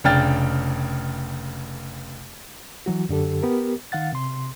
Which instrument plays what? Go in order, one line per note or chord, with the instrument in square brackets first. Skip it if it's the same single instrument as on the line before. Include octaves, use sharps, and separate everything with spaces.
[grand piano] F1 C#3 D4 G5 F6 A6
[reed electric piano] E3 F#3 F#4
F#2 D3 G4 A4
B3 G4 A#4
D#3 F5 F#5 A6
C3 C6